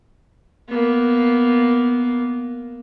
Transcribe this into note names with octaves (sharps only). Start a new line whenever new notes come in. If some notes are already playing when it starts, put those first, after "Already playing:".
A#3 B3